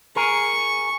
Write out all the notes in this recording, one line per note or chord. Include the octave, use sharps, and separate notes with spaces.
G#4 A#4 C#6